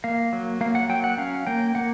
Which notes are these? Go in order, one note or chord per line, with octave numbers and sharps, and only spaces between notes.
A#3 F5
F#3
A#3 F5
F#5
F#3 G5
F#5
C#4 F5
A#3 G5
A#3 F#5